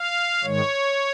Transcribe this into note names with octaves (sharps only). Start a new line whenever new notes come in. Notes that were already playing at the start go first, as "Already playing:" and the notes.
Already playing: F5
G#2 D#3 G#3 C#5